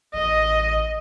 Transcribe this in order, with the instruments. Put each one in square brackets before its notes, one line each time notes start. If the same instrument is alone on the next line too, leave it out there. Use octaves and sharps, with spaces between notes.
[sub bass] A1 [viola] D#5